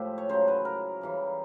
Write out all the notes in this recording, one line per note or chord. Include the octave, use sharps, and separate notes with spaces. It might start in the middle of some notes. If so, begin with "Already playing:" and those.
Already playing: A2 F3 G#3 G4
C#5
C#3 F#3 C5
B4
A#4
C#3 E3 G3